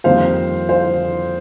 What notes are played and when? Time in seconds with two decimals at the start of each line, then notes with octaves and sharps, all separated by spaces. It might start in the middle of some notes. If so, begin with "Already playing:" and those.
0.04 F2 D#3 G3 A#3 C5 F5
0.69 C5 F5